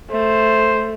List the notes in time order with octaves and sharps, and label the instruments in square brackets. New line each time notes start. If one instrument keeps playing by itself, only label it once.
[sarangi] A3 [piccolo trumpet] C5